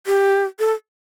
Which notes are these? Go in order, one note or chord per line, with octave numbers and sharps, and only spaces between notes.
G4
A4